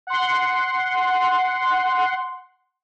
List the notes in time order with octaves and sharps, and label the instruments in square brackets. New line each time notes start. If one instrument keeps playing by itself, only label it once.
[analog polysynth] F#5 C6